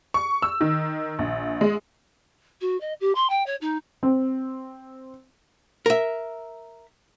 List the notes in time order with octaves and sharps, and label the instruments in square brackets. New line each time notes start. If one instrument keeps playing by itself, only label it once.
[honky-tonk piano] C#6
E6
D#3
A#1
G#3
[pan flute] F#4
D#5
G4
C6
G5
C#5
D#4
[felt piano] C4
[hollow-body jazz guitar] A#4 E5